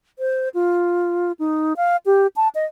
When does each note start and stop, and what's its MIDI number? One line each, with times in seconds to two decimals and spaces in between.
0.19 0.49 72
0.54 1.32 65
1.39 1.73 63
1.77 1.97 77
2.06 2.27 67
2.36 2.48 81
2.55 2.65 75